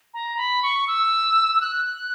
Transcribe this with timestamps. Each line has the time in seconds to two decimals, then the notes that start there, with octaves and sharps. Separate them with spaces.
0.14 A#5
0.38 B5
0.63 C#6
0.88 E6
1.55 E6
1.61 F#6